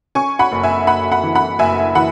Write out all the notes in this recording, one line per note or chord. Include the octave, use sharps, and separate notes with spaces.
C#4 G#5 C#6
F#5 B5
F#1
E5 G#5
F#1 F#5 B5
F#5 B5
E3
F#5 B5
F#1 E5 G#5
E3 F#5 B5